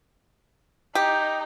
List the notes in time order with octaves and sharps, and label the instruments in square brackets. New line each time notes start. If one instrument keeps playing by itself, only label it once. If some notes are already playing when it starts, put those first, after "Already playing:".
[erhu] D#4 [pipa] G4